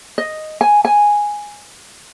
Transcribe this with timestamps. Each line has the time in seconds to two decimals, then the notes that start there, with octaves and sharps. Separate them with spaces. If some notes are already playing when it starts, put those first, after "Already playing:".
0.18 D#5
0.61 G#5
0.85 G#5